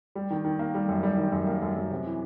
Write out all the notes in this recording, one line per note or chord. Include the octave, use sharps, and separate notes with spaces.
G3
D#3
D#3
A#3
G3
F#2
G3
D#3
F#2
A#3
F#2
F#2
C3
E3